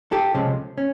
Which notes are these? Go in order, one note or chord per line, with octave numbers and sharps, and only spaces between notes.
G4 A4
C#2 C3 F3 G#3 C#4
C#4